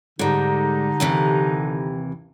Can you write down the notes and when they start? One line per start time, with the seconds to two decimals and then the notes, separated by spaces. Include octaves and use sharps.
0.19 G#2 D3 G3 D#4
1.00 D#2 C3 E3